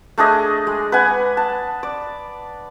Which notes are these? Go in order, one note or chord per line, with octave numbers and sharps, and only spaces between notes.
A3 D4 G#4 D#5
G#3
B4 F#5 G#5
A5
D5